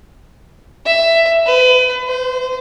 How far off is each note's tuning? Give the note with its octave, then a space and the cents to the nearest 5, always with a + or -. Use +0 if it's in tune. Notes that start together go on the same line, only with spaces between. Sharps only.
E5 +10
B4 +35
C5 -30